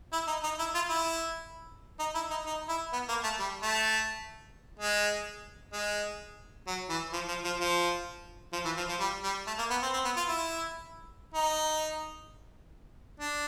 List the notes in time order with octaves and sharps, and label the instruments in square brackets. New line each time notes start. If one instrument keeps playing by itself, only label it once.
[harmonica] E4
D#4
D#4
E4
F4
E4
D#4
E4
D#4
D#4
E4
B3
A#3
A3
G3
A3
G#3
G#3
F#3
E3
F3
F3
F3
F3
F3
E3
F3
F3
G3
G3
A3
A#3
B3
C4
C4
B3
F4
E4
D#4
D4